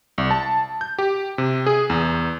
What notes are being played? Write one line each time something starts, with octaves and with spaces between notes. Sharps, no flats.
C2
A5
G6
G4
C3
G#4
E2